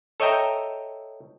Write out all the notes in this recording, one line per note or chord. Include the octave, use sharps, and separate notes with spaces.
A4 C#5 D#5 E5 G5 A#5